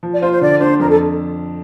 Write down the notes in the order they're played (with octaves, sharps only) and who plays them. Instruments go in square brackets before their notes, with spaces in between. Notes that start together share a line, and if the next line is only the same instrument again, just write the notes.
[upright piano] F3
[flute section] D5
[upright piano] F4 [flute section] C5
[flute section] C5
[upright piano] D3 [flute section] D5
[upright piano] D4 [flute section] C5
[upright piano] F2 [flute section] A#4
[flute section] A4